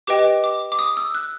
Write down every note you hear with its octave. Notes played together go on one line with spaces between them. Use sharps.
G4 B4 D#5 G5 D6
D6
D6
D#6
E6
F#6